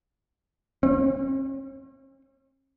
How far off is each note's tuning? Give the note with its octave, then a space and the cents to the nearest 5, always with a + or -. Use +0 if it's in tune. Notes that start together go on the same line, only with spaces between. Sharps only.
C#4 -45